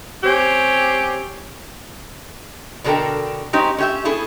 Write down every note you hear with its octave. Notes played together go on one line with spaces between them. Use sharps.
C4 C#4 G4 C#5
B2 D3 D4 A4 A#4 G5
G#3 C4 C#4 D#4 G4
C#4 G4 E5
B3 E4 G#4 A4